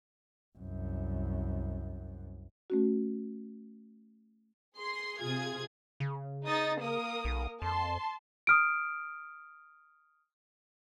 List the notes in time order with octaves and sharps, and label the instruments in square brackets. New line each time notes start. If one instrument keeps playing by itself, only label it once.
[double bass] C2 F#2
[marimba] A3 C#4 F#4
[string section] G#4 C6
C3 F4 G#4 G#6
[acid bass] C#3
[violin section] D#4 D#6 A6
A#3 A#4 D#6
[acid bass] B1
[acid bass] F2 [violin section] A5 C6
[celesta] D#6 F6 D7